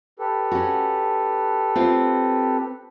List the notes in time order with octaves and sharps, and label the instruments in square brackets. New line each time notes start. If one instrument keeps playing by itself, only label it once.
[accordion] G4 A4 B4
[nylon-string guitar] C#4 F#4
C4 F4 F5